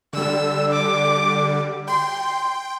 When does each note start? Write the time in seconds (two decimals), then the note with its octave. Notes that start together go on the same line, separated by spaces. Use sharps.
0.13 D3 G3 E6
0.72 D6
1.88 G5 C6